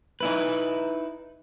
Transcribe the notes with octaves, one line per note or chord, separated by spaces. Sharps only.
D#4 E4 B4